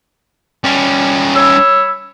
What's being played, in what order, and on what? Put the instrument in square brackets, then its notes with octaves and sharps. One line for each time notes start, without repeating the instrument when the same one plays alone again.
[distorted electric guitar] G3 C#4
[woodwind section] C#5 B5 E6